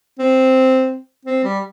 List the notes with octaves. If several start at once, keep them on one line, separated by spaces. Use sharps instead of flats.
C4
C4
G3